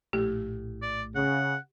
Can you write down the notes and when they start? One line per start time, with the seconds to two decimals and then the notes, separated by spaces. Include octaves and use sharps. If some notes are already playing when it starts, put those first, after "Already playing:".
0.13 A#1 A2 G4
0.82 D5
1.15 C#3 F#5